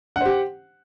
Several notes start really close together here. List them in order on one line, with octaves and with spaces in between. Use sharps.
F#5 C5 G4